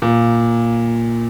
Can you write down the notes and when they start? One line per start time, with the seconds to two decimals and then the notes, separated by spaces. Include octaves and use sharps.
0.02 A#2